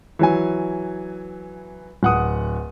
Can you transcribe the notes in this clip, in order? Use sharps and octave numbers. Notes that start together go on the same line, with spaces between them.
E3 F#3 G#5
D1 F#5 D#6